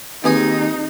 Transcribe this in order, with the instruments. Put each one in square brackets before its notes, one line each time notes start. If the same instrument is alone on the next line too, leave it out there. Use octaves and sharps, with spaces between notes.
[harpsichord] D#2 G#4 D#6 [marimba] C4 B4 G#5 [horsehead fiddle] D#4